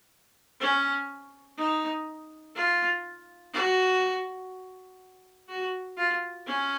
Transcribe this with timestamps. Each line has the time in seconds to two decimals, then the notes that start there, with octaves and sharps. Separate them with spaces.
0.60 C#4
1.57 D#4
2.55 F4
3.53 F#4
5.49 F#4
5.98 F4
6.46 C#4